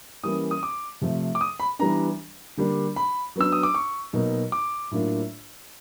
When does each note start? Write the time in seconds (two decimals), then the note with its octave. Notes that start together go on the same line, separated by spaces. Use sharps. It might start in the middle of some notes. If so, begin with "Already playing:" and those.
0.23 E3 G3 A#3 C#4 D#6
0.51 D#6
0.63 D6
1.01 C3 F3 A3
1.35 D6
1.41 D#6
1.60 B5
1.79 E3 G3 B3 D4 A#5
2.57 D3 G3 A#3 D4
2.96 B5
3.36 F#3 B3 D4 E6
3.52 D#6
3.63 D6
3.75 C#6
4.13 B2 F#3 A#3 D#4
4.52 D6
4.91 A2 F#3 A#3 D4 F4